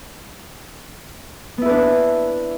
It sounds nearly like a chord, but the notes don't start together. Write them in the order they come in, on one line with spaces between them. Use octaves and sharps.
B3 E4 B4 D4